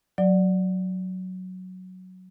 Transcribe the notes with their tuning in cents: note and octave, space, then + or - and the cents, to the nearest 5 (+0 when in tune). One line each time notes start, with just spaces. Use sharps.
F#3 +0 D5 +0